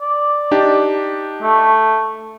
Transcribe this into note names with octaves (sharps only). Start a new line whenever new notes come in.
D5
D4 D#4 G4
A3